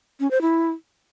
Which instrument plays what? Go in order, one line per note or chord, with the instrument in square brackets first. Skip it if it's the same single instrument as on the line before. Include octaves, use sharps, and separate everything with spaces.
[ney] C#4
C5
E4